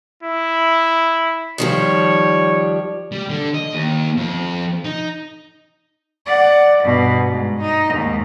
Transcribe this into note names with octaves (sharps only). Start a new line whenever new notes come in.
E4
D#3 F3 G3 C#5
G3
D3
D#5
D#2
F2
D#4
D5 F#5
G2 B2
G#2
D#4
D#2 G#2